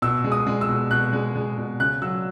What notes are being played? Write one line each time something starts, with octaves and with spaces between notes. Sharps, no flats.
B2 E6
G#3
D#6
G#3
E6
B2
B2 F#6
G#3
G#3
B2
C#3 F#6
F#3 E6